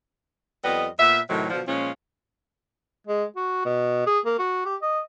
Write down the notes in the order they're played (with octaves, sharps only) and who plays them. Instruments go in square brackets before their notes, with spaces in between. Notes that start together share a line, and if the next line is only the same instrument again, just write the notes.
[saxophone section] F2 G3 B3 D#5
A#2 B3 E5
A2 C3 D#3 F#3 A3
B2 D3 F3
A#2 F3 G#3 C#4 F4
[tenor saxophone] G#3
F#4
B2
G#4
A#3
F#4
G4
D#5